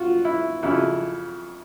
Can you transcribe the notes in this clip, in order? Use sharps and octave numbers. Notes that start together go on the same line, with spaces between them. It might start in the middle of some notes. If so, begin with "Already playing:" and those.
Already playing: F4 F#4
E4
F2 C#3 F#3 E4